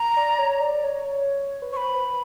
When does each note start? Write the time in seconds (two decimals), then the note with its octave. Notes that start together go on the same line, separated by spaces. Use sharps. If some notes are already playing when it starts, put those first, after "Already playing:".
Already playing: A#5
0.16 D5
0.39 C#5
0.61 D5
0.84 C#5
1.62 B4
1.73 C5 C#6
1.77 B5
1.95 B4